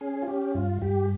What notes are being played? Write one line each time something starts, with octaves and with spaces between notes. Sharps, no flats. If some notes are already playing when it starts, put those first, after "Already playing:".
C#4 G#4
F4
C#4 G4
G2 F4
G2 G4